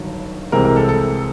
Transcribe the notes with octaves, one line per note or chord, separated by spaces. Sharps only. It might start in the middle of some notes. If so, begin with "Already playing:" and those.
Already playing: G1 G2 D#3 F#3
C2 C3 E3 G#3 C4 A#4
A#4
A4
A4